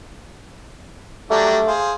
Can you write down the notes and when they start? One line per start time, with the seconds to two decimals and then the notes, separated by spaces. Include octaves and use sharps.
1.30 F#3 G3 A3 D4
1.67 G#4 C5 F5